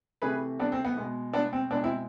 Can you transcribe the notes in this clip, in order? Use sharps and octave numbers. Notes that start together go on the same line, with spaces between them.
C3 E3 A3 G#4 B4
B3 D4
C4
B3
B2 G#3
B3 D4
C4
B2 G#3 B3 D4
C4 E4